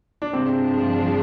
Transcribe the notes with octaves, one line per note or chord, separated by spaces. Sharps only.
D4
G2 C3 F3 G#3 C4 D4 F4